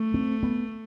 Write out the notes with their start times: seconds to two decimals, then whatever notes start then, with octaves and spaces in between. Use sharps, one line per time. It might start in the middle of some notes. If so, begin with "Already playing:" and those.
Already playing: A3
0.14 C4
0.43 B3